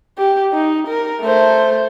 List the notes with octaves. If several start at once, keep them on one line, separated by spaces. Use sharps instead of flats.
G4
D#4
A#4
A3 C5